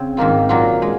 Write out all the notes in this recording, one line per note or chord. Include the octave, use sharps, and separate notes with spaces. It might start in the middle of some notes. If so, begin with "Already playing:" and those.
Already playing: C#3 C4
G#2 D#3 A#3 F4
A#2 F#3 A#3 C#4 F4
G#3